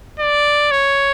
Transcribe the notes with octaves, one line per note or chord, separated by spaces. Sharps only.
D5
C#5